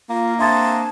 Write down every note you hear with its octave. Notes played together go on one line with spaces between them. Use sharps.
A#3 F4
C4 D4 G#4 E5 A5 C6 A6